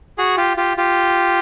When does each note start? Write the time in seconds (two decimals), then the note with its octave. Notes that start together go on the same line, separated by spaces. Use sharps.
0.18 F#4 G#4
0.37 F4 G4
0.57 F4 G4
0.77 F4 G4